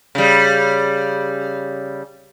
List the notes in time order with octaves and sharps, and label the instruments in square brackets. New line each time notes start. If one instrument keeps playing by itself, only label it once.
[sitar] C#3 G3